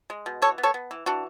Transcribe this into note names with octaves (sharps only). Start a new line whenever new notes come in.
G#3
B2
E3 A4 C#5
B3
A4 C#5
B3
E3
E3 D4 F#4